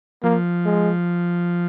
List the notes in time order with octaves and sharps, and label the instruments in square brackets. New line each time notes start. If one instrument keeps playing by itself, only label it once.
[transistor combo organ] F3 [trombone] A#3
[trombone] G#3